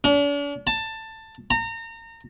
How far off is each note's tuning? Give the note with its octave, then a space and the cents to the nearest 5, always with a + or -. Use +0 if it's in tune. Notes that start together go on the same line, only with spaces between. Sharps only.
D4 -45
A5 +15
A#5 -30